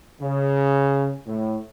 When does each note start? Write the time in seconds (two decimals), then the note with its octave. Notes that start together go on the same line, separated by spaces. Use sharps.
0.21 C#3
1.27 A2